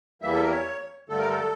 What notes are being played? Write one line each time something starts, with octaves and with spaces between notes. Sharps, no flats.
E2 E3 G3 A#3 E5
A4
A#4
C#5
G2 D3 A3 A4
A#4
A4